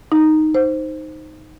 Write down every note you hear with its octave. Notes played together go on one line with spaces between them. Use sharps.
D#4
C5